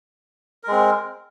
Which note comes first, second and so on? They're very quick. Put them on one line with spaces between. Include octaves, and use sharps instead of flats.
A#4 G#3 C4